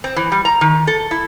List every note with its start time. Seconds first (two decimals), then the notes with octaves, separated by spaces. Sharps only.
0.04 C4
0.16 E3
0.32 G3
0.45 A#5
0.61 D#3
0.87 A4
1.11 E4